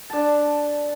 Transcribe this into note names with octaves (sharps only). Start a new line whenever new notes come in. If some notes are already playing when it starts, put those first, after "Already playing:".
D4 A5